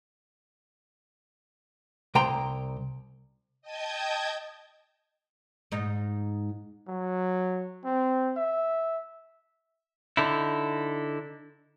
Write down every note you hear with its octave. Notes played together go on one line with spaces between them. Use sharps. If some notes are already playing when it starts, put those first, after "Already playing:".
C2 G5 A#5 C6
D#5 G5 A5 D#6 G6 G#6
G#2 D#4
F#3
C4
E5
D3 D#4 E4